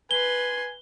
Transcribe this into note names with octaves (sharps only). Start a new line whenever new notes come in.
B4 G#5 C6 G7